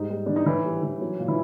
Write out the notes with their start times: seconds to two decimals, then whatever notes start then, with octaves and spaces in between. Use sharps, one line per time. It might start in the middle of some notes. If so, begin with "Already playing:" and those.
Already playing: G#2 G3 D#4
0.10 G3
0.26 E3 D4
0.36 D#4
0.46 A2 E3 E4
0.65 G3
0.83 E3
1.01 F#3
1.20 A#2
1.28 E3 E4